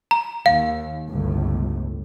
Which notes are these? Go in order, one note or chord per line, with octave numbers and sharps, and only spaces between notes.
A#5
D#2 F5
G1 C#2 A2